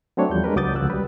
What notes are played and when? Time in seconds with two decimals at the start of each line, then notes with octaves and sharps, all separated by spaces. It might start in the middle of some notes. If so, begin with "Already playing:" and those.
0.17 F#3 A3 C4 D4 C#5
0.30 E2 F3 G3 G6
0.44 G#3 D4 A#4 B4
0.56 C#2 F#3 D6 D#6 G6 A6
0.75 C#2 F3 F#4 E6 F#6
0.90 G3 B4